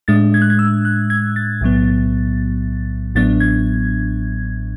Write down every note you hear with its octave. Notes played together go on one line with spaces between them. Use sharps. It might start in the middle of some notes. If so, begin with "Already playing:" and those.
A2 G#3 D4 A6
G#6
F#6
G#6
E6
F#6
G#6
A6
B1 A2 F#3 B3
A1 A2 F#3 B3 D4 A6
G#6